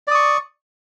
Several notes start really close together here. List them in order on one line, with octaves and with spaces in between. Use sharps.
D5 D#6 C#6